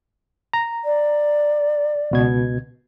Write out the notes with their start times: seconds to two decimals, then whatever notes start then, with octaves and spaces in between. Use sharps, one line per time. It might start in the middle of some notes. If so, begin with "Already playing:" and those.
0.54 A#5
0.84 D5
2.11 C#2 B2 G#6